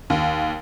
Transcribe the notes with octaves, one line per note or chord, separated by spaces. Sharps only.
D#2